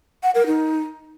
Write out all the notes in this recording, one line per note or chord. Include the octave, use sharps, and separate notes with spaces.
F#5
A#4
D#4